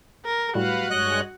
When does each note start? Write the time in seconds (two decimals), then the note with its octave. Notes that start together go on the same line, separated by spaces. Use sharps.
0.25 A#4
0.55 A2 F#3 G3 F#4 B4 F5 F#5
0.91 G2 G#3 C#5 D#5 F#6